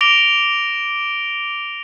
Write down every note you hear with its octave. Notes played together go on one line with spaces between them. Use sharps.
D6 A#6 D7 F7 G7